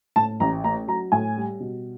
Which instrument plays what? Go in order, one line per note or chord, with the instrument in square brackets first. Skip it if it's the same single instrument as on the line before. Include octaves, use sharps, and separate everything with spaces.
[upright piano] A2 A5
A1 A#5
A3 A#5
F#3 A#5
A2 G#5
G3
B2